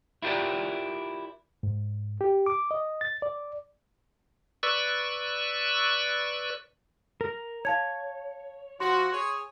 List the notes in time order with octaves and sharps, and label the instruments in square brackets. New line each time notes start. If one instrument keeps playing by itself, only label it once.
[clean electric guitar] E4 F4 G4 A#4 D5
[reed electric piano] G#2
G4
D6
D#5
A6
D5
[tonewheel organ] B4 D5 C#6 E6
[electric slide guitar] A#4
[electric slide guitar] C#5 [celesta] F5 A5 G#6
[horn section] F3 F#4 [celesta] C6
[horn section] G#4 C#5